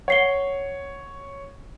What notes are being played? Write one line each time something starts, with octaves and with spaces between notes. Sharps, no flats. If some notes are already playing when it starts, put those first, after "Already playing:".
C#5 F#5 C7 G7